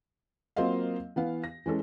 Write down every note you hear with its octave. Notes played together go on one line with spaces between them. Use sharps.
F#3 A#3 C4 F4 D#5 F5
E3 B3 F5
A#6
E3 G#3 C#4 A4